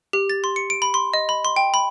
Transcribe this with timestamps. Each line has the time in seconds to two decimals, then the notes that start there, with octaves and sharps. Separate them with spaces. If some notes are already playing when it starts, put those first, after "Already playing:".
0.13 G4
0.30 A6
0.44 C6
0.56 C#7
0.70 D7
0.82 B5
0.94 C6
1.14 D#5
1.29 B5
1.45 C6
1.56 G5
1.74 B5